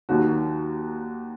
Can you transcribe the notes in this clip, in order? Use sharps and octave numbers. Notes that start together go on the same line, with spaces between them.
D#2 D#3 F#3 F#4